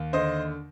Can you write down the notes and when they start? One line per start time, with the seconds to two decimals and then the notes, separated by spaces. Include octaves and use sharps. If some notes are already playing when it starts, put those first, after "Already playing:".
Already playing: D#2
0.13 D3 C5 D#5